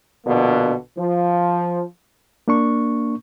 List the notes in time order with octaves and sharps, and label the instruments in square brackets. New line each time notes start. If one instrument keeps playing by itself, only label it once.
[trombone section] A#1 B2 D3 A#3
F3
[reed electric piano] A#3 D4 C#6